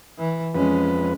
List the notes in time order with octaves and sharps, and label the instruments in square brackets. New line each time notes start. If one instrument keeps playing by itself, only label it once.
[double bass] E3
[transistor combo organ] F2 B4 [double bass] G#3 C#4